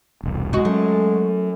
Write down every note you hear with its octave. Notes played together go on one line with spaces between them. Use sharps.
E1 C2
G#3 D#4 F#4
F#3 A3 C#4